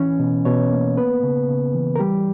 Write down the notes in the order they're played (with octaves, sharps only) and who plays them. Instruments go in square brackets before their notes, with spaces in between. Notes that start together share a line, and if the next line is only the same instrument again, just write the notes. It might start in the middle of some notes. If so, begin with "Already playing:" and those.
Already playing: [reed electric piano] E3 C#4
B2
B2 C#5
A#3
B3 B4
C#3
C#3
E3
A#4
G3 G4